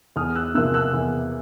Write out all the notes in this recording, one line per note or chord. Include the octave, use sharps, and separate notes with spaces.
E2 D#6 F6
E6 F#6
C3 F3 A#3 E6 F#6
E6 F#6
E2